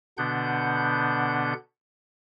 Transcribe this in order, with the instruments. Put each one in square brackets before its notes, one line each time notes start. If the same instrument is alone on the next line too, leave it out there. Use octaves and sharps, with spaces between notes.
[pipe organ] B2 D3 B3 D4 F#5 G6